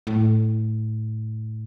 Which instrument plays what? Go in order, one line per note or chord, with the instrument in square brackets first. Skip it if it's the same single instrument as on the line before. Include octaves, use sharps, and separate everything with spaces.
[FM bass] A2